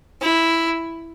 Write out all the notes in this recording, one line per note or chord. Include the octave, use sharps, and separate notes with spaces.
E4